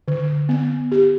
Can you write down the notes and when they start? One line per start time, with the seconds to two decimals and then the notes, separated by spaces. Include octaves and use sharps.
0.08 D3
0.49 B3
0.92 G4